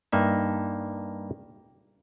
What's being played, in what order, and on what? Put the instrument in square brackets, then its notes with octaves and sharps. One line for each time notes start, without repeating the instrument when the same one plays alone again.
[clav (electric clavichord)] G2 A#3 D#4 E5